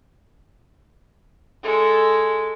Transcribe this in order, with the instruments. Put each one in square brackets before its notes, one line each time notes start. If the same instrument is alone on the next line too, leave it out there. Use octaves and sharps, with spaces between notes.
[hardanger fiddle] G#3 A4